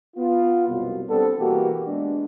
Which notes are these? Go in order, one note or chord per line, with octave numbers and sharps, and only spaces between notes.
B3 F4
C2 F#2 B2
G3 B3 C4 D4 A4
B2 E3 A#3 B3 F#4 G4
G#3 B3 D4